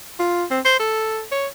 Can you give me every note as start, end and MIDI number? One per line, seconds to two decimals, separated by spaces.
0.19 0.44 65
0.51 0.60 60
0.65 0.76 72
0.79 1.21 69
1.31 1.47 73